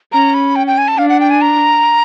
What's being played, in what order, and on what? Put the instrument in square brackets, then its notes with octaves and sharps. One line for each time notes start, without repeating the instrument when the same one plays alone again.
[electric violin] C#4 [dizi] A#5
[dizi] B5
G5
G5
G#5
A5
[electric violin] D4 [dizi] F5
[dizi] F#5
G5
G#5
A#5